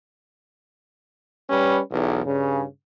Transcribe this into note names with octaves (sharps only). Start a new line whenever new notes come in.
G3 C#4 G4 B4
B1 E2
G2 C#3